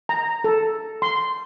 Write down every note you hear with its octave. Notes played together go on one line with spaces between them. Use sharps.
A#5
A4
C6